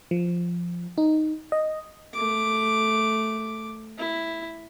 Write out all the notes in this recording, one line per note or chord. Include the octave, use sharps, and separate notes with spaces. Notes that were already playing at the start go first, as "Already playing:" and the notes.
F3
D#4
D#5
A3 D6
E4